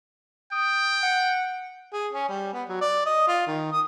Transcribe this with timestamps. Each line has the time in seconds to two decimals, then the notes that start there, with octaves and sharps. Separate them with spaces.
0.52 G5 D#6
1.03 F#5
1.92 G#4
2.13 C#4
2.28 G3
2.53 B3
2.69 F#3
2.81 D5
3.06 D#5
3.27 F4
3.47 D#3
3.72 D#6